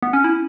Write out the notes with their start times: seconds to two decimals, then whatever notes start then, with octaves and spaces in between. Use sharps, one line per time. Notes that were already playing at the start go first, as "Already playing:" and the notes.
0.03 B3
0.13 C#4
0.24 E4